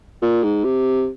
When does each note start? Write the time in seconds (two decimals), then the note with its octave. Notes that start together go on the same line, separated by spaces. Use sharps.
0.22 A#2
0.43 G#2
0.64 C3